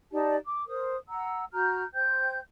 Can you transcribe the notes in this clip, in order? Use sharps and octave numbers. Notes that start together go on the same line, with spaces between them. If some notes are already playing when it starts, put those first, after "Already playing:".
D#4 G4 D5 A5
D6
A#4 C5 D#6
F#5 A#5 E6
F#4 A#5 F6 G6
C5 G5 G6